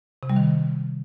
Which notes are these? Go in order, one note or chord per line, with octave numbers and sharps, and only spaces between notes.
C3
G3
D#3